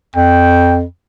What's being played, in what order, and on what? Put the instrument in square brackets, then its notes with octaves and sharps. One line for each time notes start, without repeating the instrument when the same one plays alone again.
[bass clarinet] F2 [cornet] G5